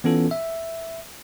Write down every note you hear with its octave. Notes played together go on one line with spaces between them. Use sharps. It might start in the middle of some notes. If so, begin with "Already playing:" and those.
E3 B3 C#4 F4 A4
E5